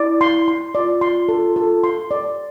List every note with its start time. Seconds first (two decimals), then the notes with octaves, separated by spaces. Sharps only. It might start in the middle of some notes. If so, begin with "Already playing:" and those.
Already playing: E4 D5
0.21 C6
0.48 C6
0.75 F4 D5
1.01 C6
1.29 A4
1.56 A4
1.84 C6
2.11 D5